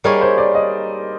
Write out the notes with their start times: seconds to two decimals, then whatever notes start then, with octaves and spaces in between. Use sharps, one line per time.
0.04 G3 A#3 D#4 G#4 A#4 C#5
0.21 C5
0.38 D5
0.55 D#5